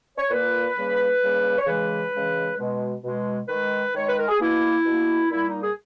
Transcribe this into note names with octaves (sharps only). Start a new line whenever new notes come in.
C#5
A#2 A#3 B4
C#3 G3 A#3
C#3 G3 A#3
C#5
C#3 E3 G#3 B4
C#3 E3 G#3
B2 G#3
B2 G#3
D#3 G#3 B4
D#3 G#3 C#5
B4
A#4
G#4
B2 A#3 E4
B2 A#3
A#2 G3 A#3 E4
D#4
G#4